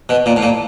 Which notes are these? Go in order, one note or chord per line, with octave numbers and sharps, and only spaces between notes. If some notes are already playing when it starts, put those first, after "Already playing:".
B2
A#2
A2
A#2